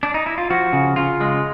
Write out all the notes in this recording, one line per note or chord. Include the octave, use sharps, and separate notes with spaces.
D4
D#4
E4
F4
F3 F#4
C#3
C#3 F4
G#3